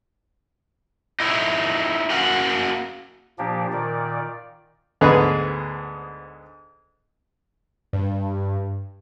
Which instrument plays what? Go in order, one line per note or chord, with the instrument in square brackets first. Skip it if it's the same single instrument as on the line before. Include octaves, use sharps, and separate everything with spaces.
[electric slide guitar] D#4 E4 C#5
A#3 C#4 F#4 F5 F#5
[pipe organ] A#2 F3 A#3 D4 G4
A#2 D#3 D5
[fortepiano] D2 G#2 B3 G#4 B4 D#5
[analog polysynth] G2